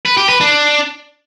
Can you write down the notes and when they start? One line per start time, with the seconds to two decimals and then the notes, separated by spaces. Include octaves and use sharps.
0.06 B4
0.17 G4
0.29 B4
0.41 D4